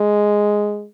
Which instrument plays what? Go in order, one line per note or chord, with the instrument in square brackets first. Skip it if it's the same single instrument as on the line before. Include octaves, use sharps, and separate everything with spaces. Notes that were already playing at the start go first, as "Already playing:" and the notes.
Already playing: [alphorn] G#3